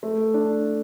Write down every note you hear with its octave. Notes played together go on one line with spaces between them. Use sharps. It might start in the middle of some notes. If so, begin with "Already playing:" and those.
A3
D4